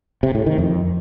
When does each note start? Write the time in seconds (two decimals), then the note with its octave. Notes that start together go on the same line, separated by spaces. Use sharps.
0.23 C3
0.35 A2
0.46 D#3
0.58 F2